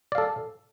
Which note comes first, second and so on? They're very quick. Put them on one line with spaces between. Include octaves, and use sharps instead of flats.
D5 F5 A4